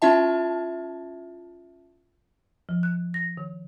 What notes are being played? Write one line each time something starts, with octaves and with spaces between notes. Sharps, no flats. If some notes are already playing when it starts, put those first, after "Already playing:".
C#4 E4 F4 E5 A5
F3
F#6
A#6
D#3